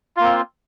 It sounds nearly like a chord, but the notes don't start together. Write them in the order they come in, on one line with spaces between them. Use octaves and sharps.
F4 A#3 C4